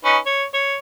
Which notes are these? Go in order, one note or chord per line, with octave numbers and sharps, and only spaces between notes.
C#4 D#4 B4
C#5
C#5